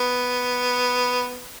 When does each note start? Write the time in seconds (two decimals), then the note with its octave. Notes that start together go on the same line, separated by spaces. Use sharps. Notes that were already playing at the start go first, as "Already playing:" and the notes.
Already playing: B3